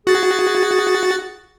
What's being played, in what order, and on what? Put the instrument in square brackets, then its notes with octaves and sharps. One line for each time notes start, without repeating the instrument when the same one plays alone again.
[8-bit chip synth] F#4 A6 [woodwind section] G#4